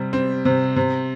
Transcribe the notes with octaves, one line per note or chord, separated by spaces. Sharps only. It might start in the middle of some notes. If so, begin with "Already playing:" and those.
Already playing: C3 G3
C4
C3
C3